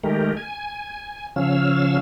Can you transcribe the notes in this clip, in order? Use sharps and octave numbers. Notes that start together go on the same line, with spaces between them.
D#3 G#3 A3 G4 A#4
G#5
C#3 F3 C#4 F5 E6